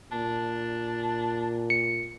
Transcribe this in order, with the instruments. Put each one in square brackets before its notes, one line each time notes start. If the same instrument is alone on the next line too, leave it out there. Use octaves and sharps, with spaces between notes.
[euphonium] A#2 [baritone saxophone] D4
[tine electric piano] C#7